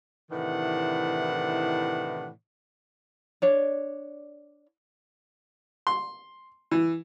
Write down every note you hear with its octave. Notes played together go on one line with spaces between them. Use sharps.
A2 C3 D#3 E3 D4 F#5
D4 C#5 D5
C6
E3